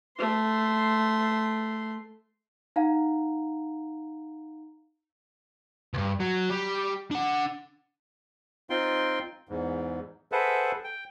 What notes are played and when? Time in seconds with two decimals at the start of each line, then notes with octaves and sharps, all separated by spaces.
0.18 A3 C6
2.76 D#4 F5 F#5 A#5
5.94 C#2 G2
6.20 F#3
6.50 G3
7.11 D4 F#5
8.70 C4 D#4 F4 G5 C6
9.49 E2 G#2
10.32 G#4 A4 B4 C5 E5 F#5
10.84 G5